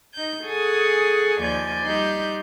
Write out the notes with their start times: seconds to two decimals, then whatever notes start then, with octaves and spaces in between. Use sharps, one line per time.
0.13 D#4 G6
0.44 G#4 A4 F#5 G#5 C#6 D#6
1.41 D#2 F3 D5 G#5 G6
1.86 G3 D#4 G4 C6 F#6 G6